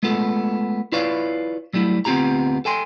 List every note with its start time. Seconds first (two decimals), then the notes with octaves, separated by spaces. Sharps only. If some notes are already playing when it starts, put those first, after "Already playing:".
0.03 G#3 A3 B3 F4 A4
0.92 E4 F4 B4 C#5 D5 F5
1.73 F#3 G3 A3 E4
2.05 D2 B3 C4 F4 G4 A#5
2.65 A4 G5 G#5 C6